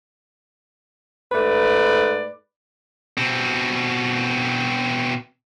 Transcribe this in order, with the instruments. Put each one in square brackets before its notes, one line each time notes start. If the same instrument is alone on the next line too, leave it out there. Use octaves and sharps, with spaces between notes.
[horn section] G#2 A3 B4 D5
[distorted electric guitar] B2 C4